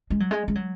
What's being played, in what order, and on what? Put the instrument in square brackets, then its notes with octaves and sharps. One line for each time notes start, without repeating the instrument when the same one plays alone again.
[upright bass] G#3
F#3
G#3
G#3
F#3